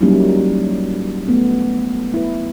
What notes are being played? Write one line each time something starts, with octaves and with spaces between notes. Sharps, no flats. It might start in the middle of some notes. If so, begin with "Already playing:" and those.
F#3 G3 A#3 C#4 D#4 E4
A3 B3
E4 B4